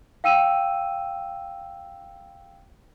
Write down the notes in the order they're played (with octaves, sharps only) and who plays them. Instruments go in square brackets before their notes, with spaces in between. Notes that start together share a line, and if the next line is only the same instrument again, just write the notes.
[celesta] F5 G5 E6 D#7 E7